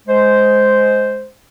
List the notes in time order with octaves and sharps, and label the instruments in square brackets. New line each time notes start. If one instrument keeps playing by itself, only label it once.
[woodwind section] G#3 C5